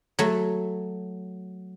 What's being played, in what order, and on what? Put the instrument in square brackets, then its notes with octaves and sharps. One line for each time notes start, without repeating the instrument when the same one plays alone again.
[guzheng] F#3 A3